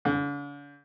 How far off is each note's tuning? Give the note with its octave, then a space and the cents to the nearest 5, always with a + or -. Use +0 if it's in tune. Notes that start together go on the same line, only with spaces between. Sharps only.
D3 -45